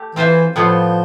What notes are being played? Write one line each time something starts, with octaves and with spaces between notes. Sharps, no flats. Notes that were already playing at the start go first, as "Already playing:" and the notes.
Already playing: A3 G4 D5
E3 C4 F4 C5 E5
A2 F3 G3 B3 F4